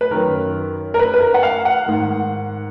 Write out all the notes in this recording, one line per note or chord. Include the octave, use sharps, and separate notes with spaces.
B4
F#2 D#3 A#4
A#4
B4
B4
A#4
F#5
F5
F#5
G#2 D#3